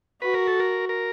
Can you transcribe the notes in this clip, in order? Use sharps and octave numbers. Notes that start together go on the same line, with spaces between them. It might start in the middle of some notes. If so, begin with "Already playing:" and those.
F#4 B4
A#4
A4
A#4
A#4